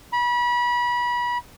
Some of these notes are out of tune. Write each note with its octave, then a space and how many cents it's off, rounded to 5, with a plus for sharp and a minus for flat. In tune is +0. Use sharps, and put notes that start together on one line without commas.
B5 -30